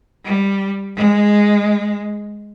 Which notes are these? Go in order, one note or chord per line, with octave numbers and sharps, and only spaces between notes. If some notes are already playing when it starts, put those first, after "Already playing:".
G3
G#3